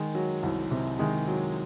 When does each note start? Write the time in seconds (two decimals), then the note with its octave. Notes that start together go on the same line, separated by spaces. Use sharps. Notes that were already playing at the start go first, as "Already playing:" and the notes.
Already playing: D#3 G#3
0.15 F#3
0.43 C2
0.71 C3
0.99 D#3 G#3
1.28 F#3